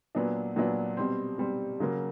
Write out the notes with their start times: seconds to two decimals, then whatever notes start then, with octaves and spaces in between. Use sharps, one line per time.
0.15 A#2 F#3 B3 D4
0.56 A#2 F#3 B3 D4
0.97 B2 G3 C4
1.38 B2 G3 C4
1.80 C#3 F#3 A#3